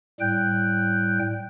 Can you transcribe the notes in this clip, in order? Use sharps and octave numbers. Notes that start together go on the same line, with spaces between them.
A2 G3 G5 F#6 G6